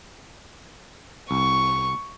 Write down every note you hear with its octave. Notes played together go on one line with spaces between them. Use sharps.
C2 C#6